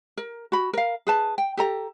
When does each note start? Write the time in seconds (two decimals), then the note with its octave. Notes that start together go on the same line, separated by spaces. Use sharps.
0.17 A#4
0.52 F#4 B5
0.73 A#4 F5
1.07 G#4 B4 A5
1.38 G5
1.57 G4 A4 A#5